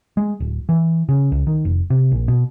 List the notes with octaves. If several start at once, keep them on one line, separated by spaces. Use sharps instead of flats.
G#3
D1
E3
C#3
C#2
D#3
F1
C3
A#1
B2